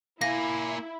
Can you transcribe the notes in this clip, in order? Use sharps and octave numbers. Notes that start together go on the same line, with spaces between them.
A#3 E4 F5 G#5 A#6